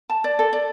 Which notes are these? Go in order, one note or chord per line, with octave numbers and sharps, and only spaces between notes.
A5
D5
A4
D5